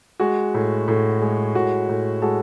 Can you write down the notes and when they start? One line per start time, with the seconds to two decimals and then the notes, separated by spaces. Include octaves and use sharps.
0.20 G#3 F#4
0.54 A2
0.88 A2
1.21 G#3
1.55 A2 F#4
1.89 A2
2.22 G#3 F#4 A4